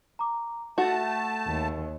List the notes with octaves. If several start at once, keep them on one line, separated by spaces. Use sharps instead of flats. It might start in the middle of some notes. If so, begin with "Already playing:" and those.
A#5 D6
A3 F#4 F#5 A5
D#2